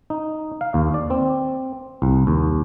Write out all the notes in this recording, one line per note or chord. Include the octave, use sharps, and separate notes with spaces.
D#4
F5
D#2
D5
C4
C2
D#2